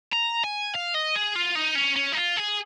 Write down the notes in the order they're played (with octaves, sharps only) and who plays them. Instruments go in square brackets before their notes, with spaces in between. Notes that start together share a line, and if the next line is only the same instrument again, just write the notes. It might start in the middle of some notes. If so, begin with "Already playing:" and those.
[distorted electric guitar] A#5
G#5
F5
D#5
G#4
F4
D#4
C#4
C#4
D#4
F4
G#4